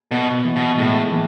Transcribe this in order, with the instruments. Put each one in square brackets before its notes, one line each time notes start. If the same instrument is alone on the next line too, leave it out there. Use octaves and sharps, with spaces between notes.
[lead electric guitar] B2 [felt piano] B3
[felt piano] E3
[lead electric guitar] B2
[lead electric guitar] A2 [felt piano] G#3
[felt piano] E3